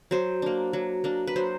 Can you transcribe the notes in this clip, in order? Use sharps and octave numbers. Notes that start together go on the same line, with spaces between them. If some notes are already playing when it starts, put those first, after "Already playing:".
F#3 C5
A#3 D4
F#3
A#3 D4
B4
F#3 C5